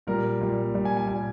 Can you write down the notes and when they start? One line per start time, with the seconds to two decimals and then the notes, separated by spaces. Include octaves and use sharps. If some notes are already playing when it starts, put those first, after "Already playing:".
0.07 A#2 G3 A#4
0.41 A#2 G3
0.74 A#2 G3
0.85 G#5
0.97 G#5
1.07 A#2 G3 G#5